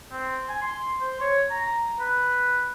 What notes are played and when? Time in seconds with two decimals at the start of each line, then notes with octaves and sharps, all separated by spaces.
0.12 C4
0.49 G#5
0.62 C6
1.00 C5
1.21 C#5
1.50 A#5
2.00 B4